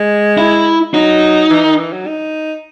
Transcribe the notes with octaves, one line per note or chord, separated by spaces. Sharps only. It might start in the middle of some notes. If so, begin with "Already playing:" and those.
Already playing: G#3
E4
F#3 D#4
E3
D#3
E3
F#3
D#4